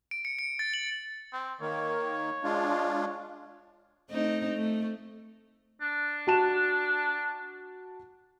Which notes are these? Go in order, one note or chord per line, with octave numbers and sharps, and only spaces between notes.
D7
C#7
C#7
A6
F#7
C4
D#3 A#3 C#5
G#3 D4 F4
A3 C4 D#4
A3
D4
F#4 A5 E7